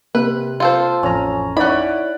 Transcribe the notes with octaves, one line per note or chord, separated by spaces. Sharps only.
C3 A#3 B4
F4 A4 C5
A1 F2 C#4 A#5
C#4 D#4 E4 D5 F#5 B5